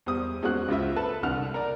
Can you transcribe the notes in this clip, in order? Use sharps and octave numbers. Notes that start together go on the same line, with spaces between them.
E2 G3 C5 D#6
E2 G#3 C4 C#4 F#4 F#6
C#2 C#3 F4 C5 E5
A4 B4 A5
C2 D3 F#5 F6
A#4 D5